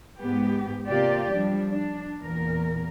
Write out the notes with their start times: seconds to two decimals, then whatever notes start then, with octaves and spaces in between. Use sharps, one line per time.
0.19 G#2 B3 G4
0.88 C3 A#3 F4 G4 D5
1.32 F3 G3 D4
1.70 D4
2.22 E2 A#2 A#4